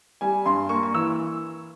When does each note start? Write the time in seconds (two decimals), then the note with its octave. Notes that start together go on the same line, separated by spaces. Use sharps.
0.21 G3 G#5
0.45 G2 C6
0.69 A#3 C#6
0.83 C#6
0.94 E3 E6